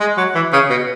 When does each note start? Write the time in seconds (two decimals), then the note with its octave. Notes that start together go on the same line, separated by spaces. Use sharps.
0.01 G#3
0.18 F#3
0.35 E3
0.53 C#3
0.70 B2